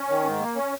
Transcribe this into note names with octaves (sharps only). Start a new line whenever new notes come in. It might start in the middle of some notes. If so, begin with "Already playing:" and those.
Already playing: C#4
D#3
G#2
A#3
C#4